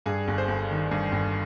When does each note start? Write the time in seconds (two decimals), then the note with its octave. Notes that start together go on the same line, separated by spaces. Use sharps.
0.06 G2 G#4
0.28 G1
0.38 C5
0.48 G1
0.71 D#3
0.91 G2
1.12 G1